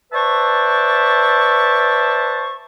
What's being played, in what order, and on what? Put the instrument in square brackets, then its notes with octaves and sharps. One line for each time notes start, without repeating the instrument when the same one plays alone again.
[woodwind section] B4 C5 D5 E5 A5 C#6